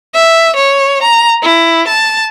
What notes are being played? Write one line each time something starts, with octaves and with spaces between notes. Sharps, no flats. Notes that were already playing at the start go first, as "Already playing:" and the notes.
E5
C#5
A#5
E4
A5